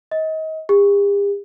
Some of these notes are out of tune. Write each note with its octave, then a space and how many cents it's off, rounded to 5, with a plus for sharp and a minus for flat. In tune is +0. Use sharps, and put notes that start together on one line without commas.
D#5 +30
G4 +45